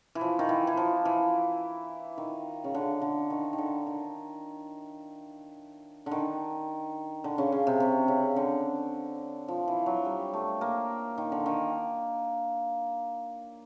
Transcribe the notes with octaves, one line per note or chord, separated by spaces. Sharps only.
E3
F3
D#3
E3
E3
F3
E3
D#3
C#3
D3
D3
D#3
D#3
D3
D#3
D3
D#3
D3
C#3
C#3
C3
C3
C#3
D3
F3
E3
F#3
G3
A3
A#3
D#3
D3
D#3